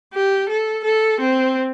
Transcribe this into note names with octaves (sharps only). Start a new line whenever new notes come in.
G4
A4
A4
C4